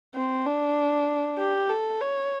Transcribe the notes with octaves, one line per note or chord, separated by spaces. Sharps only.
C4
D4
G4
A4
C#5